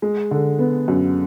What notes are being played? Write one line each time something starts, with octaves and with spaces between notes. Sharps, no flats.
G#3
D3
B3
F#2